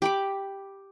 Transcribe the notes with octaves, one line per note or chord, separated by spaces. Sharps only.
G4 B5 D6